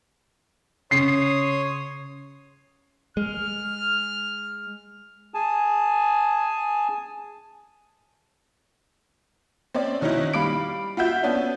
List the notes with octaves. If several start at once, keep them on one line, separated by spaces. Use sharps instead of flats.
C#3 C#5 C6 D#6 C7
G#3 F6
G#4 G#5 A5
C4 C#4 D5
B2 D#3 C#4 D#4 E4
G3 F5 B5 D6 D7
F4 F#4 E5 G6
B3 C#4 D4